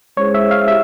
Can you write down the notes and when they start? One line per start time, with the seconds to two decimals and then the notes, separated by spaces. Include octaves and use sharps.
0.17 G#3 C#4 E4 G#4 C5 C#5
0.34 E5
0.51 F5
0.68 E4 G4 E5